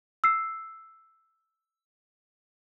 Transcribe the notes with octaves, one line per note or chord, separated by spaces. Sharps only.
E6 C7